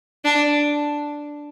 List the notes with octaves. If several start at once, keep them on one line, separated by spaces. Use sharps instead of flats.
D4